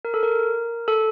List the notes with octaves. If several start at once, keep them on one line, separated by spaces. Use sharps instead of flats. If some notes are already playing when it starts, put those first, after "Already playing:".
A#4
A4
A#4
A4